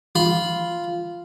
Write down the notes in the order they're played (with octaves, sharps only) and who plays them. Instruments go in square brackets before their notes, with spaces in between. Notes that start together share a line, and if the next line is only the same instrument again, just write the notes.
[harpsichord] F4 B5